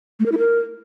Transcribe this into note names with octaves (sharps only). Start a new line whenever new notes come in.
A3
A#4
E4
A#4